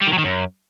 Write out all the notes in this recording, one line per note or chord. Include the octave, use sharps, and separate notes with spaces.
G3
D#3
F#3
D#3
F#2